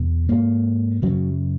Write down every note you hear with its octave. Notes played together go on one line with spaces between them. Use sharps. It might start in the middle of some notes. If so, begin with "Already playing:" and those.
Already playing: E2 B2
G#2 A#3
F#2 C#3 F#3